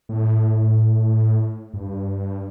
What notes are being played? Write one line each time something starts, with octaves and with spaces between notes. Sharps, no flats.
A2
G2